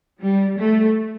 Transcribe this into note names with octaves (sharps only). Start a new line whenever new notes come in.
G3
A3